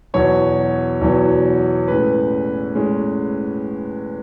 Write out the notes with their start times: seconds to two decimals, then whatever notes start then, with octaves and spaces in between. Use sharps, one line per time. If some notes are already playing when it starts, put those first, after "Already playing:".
0.14 E2 B2 F#3 B3 C#5
1.01 E2 B2 F#3 B3
1.88 A2 G#3 C#4 B4
2.75 A2 G#3 C#4